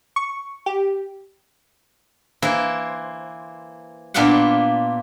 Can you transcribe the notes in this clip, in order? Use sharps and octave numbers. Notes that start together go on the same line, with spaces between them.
C#6
G4
E3 A#3 E4 C5
A#2 B3 D4 F4 F5 F#5